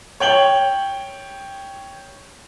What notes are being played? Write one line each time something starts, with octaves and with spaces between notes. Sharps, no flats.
C#5 G5 F#7 G7